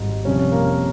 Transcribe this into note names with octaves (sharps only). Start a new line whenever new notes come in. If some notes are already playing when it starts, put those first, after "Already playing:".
Already playing: G#1 G#2 G3 D#4
F2 C3 G3 C#4
A#3